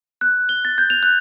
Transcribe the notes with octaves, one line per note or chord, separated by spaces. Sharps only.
F#6
G7
A6
G6
F7
F#6